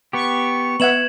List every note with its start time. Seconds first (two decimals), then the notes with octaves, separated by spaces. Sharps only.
0.13 B3 G4 C#6
0.80 B3 E5 F#5 G#6 E7 F#7